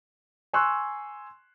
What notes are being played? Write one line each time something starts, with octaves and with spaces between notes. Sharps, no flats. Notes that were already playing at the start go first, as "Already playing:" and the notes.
G#5 C6 C#6 E6 F#6